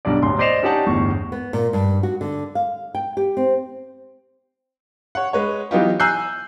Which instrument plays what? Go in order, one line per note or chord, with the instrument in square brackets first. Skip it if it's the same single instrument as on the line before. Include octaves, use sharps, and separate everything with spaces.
[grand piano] B1 G3 D4 D5
D1 C3 C6
C5 D5 D#5 C7 E7 F7
C#4 D#4 G4 D5 F#5 A5
G1 E2 A2 C#6
[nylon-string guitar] B3
A#2
G2
F#4
D3
F5
G5
G4
C4
[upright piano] C#5 F#5
G#3 B4 C#5
E3 F#3 B3 D#4 F4 G4
G#5 A#5 E6 F#6 G6 C7